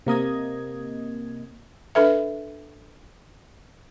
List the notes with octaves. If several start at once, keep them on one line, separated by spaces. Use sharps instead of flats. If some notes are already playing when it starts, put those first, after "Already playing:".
C3 A#3 D#5 G#6
D4 A4 B4 E5